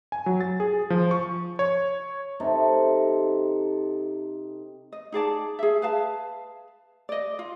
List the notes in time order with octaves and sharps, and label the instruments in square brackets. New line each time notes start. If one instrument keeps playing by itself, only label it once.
[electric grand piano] G#5
F#3
A6
G#4
F3
C#6
C#5
[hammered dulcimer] C3 D#4 A4 C6
[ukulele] D#5
D#4 G#4 D5 A5
G#4 E5
B4 F5 A5
D5 D#5
F4